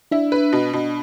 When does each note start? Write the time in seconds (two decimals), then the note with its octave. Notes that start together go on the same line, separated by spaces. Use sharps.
0.11 D4 E4
0.32 B4
0.53 B2
0.73 B2